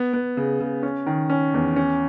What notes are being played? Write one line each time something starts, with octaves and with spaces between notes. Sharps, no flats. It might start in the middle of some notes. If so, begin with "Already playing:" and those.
Already playing: B3
B3
C#3
C#3
C#4
D#3
C#4
E2
C#4